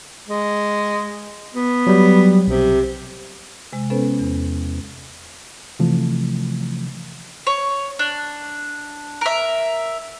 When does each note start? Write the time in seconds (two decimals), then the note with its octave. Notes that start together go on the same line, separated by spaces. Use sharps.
0.28 G#3
1.55 B3
1.87 F#3 G3
2.47 B1 C3
3.73 C3 G#3
3.90 B3 C#4 A4 B4 C5
4.19 E2
5.79 C3 E3 F3 A3
7.47 C#5
7.99 D4
9.21 A#4 E5